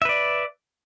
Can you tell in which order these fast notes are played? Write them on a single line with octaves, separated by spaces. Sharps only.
E5 B4 D5